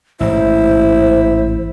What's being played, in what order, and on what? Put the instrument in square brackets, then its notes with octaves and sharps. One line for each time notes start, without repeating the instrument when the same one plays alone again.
[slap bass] A1 G#2 [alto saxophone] E4 [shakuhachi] C5